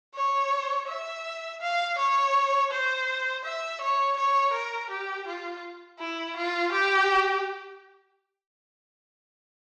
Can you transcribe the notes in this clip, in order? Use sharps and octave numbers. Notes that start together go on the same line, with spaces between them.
C#5
E5
F5
C#5
C5
E5
C#5
C#5
A#4
G4
F4
E4
F4
G4